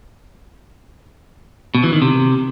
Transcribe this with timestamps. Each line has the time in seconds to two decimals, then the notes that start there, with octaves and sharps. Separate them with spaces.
1.75 B2
1.84 E3
1.93 D#3
2.02 C3